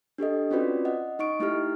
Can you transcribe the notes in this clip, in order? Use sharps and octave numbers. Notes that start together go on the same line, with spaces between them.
D4 G4 A4 D#5
C4 C#4 F4 F#4 B4 D5
D#5 F#5
D#4 D#5 C#6 D7
A3 D#4 E4 G4 F6